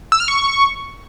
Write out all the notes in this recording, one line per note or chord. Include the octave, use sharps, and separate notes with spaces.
E6
F6
C#6